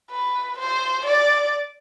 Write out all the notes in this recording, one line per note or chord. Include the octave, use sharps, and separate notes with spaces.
B4
C5
D5